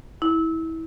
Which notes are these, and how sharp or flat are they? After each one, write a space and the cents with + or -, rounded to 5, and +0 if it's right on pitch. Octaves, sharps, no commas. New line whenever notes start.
E4 -25